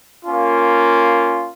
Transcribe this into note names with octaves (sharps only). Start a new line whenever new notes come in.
A#3 C#4 F4